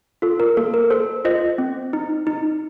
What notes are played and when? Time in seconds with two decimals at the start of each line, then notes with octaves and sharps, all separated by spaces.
0.22 F4 A4
0.40 A#4
0.57 A#3 A4
0.74 A#4
0.90 A4 C5
1.25 F4 C5 D#5
1.58 C4
1.93 D#4
2.27 D#4